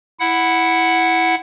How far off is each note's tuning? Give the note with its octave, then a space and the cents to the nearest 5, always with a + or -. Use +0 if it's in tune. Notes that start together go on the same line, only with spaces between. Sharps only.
E4 +0 F#5 +0